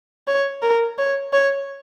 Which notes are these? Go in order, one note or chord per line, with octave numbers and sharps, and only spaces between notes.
C#5
A#4
C#5
C#5